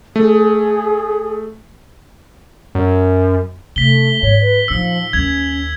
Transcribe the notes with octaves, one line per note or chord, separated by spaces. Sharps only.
A3 G#4
F#2
C3 A3 B6 G7
G#2 C#5
B4
A#2 F3 D#4 E6
D#2 D#3 C#4 G#6